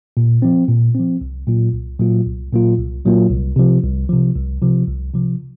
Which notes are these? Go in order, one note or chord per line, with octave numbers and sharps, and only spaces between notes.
A#2
F3 C4
A#2
C4
F3
C2
A#2 F#3 A#3 F4
C2
A#2 F#3 A#3 F4
C2
A#2 F#3 A#3 F4
C2
A#2 F#3 A#3 F4
C2
C3 F3
C2
C3 F3
C2
C3 F3
C2
C3 F3